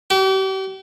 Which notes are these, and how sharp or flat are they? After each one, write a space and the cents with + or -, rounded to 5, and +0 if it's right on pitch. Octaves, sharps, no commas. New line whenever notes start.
G4 -40